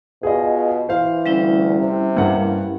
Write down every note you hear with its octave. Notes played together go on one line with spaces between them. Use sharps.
B2 F4 G#4 D#5
E3 C5 F5
D2 G3 C#4 E4
C3
G2 A#3 F#5